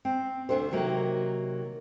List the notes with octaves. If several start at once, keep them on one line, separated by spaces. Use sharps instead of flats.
C4
D2 B2 D4 A4 C5
C3 D#3 F#3 A#3